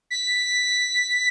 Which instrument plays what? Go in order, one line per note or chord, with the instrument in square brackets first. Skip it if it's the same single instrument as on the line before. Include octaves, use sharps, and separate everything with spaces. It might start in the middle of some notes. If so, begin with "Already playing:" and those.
[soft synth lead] B6